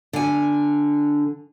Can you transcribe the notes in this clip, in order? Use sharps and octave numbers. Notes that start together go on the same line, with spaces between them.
D3 G#5